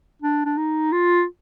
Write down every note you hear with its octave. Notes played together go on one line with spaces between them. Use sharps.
D4
D4
D#4
F4